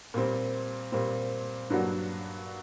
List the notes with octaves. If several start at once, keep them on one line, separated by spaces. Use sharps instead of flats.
A#2 G3 C4
A#2 G3 C4
G2 F#3 A#3 D4 F#4